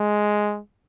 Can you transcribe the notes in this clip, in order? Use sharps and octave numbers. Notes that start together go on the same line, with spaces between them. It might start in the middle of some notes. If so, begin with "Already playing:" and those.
Already playing: G#3